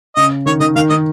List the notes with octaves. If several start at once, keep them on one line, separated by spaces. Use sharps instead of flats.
C#3 D#5
D#3 C#5
D#3 D#5
D#3 F5
D#3 D#5